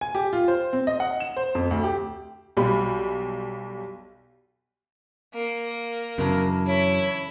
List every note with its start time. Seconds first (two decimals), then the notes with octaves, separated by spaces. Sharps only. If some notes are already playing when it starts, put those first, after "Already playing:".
0.01 G#5
0.15 G4
0.33 F4
0.48 C5
0.73 C4
0.87 D#5
1.00 F#5
1.20 E7
1.37 C5
1.55 F2
1.71 D2
1.84 G4
2.57 B1 G3 B5
5.34 A#3
6.18 F#2 C#3 E3 D4 A#4
6.67 E4 C#5